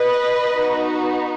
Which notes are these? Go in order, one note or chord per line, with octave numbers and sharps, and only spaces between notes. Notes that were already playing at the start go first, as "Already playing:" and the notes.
Already playing: B4 D#5
B3 D#4 F#4